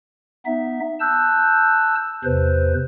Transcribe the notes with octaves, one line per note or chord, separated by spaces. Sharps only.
B3 D#4 E5
A5 E6 F#6 G6
E2 C3 B4 C5